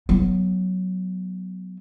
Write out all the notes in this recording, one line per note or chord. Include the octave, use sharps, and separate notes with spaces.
F#3 B3